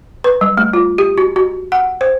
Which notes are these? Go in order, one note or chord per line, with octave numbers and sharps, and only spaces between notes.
B4
G3
A3
F4
G4
F#4
F#4
F#5
C5